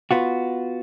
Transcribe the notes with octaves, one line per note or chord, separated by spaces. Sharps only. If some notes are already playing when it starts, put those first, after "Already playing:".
B3 F4 F#4